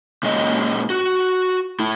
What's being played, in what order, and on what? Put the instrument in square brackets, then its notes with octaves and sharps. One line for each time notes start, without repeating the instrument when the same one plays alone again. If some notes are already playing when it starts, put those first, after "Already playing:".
[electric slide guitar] A#2 G#3 C#4 D#5
F#4
A2 E4